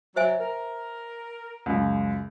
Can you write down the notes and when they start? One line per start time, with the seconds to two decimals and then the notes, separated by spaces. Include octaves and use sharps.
0.16 F#3 C5 E5 G#5
0.40 A#4
1.66 C#2 F#2